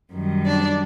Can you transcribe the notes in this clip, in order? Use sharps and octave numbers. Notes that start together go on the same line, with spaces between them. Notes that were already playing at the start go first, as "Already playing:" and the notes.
F#2 D#3 G3
D4 D5